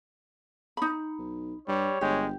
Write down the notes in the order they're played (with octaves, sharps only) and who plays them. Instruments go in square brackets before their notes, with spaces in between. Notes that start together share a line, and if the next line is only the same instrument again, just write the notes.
[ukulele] D#4 B5
[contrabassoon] B1
[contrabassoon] G2 [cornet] G3 [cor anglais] C#5
[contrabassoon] G1 [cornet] G#3 [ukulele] G4